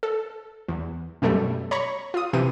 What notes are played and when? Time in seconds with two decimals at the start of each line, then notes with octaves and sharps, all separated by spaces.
0.03 A4
0.68 E2
1.22 F#2 B2 G3 A3
1.71 C#5 A#5 B5 C#6
2.14 F4 D#6
2.33 C3 E3 C4 D#7